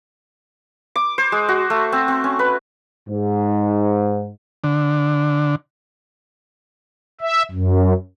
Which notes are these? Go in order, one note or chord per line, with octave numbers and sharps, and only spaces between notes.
D6
C5
G#3
F#4
A3
C4
C4
C#4
B4
G#2
D3
E5
F#2